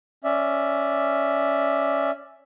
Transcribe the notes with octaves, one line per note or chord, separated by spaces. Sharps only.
C#4 D5 E5